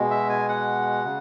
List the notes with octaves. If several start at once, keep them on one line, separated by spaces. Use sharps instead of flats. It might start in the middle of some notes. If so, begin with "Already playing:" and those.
Already playing: B2 G#3
E5
G#5
F#5
C#3